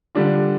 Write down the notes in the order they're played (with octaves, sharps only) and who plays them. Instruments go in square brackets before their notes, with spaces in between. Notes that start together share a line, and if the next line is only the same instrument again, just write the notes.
[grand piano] D3 G3 D4 F4